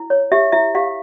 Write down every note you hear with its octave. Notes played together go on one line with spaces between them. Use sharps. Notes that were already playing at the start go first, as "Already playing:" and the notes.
Already playing: E4
C#5
G4 E5
E4 E5
G4 F5